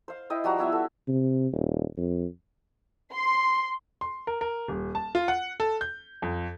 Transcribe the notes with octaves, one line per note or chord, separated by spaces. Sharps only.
C5 F5
E4 D#5 G5
F3 G3 F#4 A#5
B3 E4 E5
A4
C3
D#1
F2
C6
C6
A#4
A#4
D#1
A5
F4
F#5
A4
G6
F2